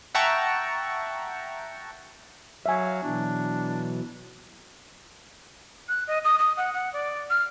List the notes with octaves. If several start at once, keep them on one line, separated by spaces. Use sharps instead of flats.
E5 F#5 G5 A5 A#5 C#6
F#3 E5 F5 G#5
B2 E3 F#3 D4
F#6
D#5
D#6
D#6
F#5
F#5
D5
F6